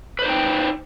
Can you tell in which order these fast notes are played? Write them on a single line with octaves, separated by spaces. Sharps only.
B4 C5 D#4 G5